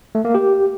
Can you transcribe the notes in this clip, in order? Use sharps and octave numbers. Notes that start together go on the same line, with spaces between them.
A3
A#3
G4